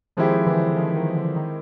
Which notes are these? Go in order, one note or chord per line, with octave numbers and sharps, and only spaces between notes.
D#3 F3 G#3 C4 E4 G4
D3 E3
D#3 F3
D#3
D3
D#3